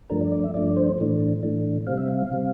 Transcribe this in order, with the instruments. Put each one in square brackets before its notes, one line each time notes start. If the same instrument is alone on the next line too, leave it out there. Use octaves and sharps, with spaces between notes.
[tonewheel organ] G2 F3 A3 D4 A#4
D5
D5
E5
G2 F3 A3 D4 D5
C5
A2 E3 A3 D4
A2 E3 A3 D4
C3 G3 C4 F5
E5
F5
C3 G3 C4